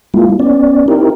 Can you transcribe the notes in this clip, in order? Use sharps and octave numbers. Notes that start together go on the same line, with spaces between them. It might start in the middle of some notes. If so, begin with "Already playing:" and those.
G3 G#3 A#3 E4 F4
B3 C#4 D5
C4 D#4 E4 G4 A#4